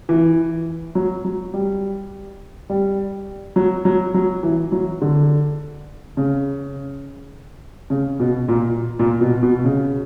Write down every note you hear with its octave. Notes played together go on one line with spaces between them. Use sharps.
E3
F#3
F#3
G3
G3
F#3
F#3
F#3
E3
F#3
D3
C#3
C#3
B2
A#2
A#2
B2
B2
C#3